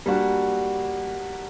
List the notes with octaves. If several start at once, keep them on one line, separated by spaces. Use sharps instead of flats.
G3 A#3 D4 F#4